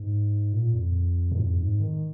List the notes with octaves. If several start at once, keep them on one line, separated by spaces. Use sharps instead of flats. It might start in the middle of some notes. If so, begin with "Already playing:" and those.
Already playing: G#2
A#2
F2
G#2
F2
G#2
D#3